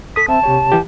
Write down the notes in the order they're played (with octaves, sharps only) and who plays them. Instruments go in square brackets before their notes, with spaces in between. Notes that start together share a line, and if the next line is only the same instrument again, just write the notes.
[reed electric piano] A4 D#6 [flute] B6
[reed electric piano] C4 E5 [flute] A5
[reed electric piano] C3 G4 C#5
E3 G4